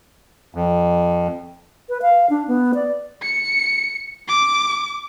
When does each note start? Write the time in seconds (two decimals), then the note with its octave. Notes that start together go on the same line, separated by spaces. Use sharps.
0.55 F2
1.89 B4
2.02 F5
2.30 D4
2.48 B3
2.75 D5
3.22 C#7
4.28 D6